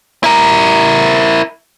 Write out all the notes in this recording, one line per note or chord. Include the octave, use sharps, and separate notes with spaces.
E4 A#4